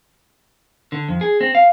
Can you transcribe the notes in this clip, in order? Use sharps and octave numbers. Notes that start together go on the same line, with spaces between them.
D3
F2
G#4
C4
F5